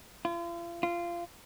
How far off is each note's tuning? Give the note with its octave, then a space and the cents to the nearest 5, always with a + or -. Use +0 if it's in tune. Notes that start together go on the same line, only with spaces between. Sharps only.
F4 -40
F4 -20